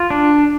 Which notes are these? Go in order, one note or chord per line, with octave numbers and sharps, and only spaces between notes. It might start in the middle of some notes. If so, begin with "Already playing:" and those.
Already playing: F4
D4